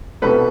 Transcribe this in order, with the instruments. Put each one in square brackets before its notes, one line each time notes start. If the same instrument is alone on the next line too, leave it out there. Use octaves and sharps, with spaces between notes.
[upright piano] C2 B2 G3 A4 B4